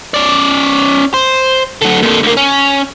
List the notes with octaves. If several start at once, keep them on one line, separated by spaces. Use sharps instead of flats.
C#4 D5
C5
D3 F#3
A#2 D3
D2 A#3
C#4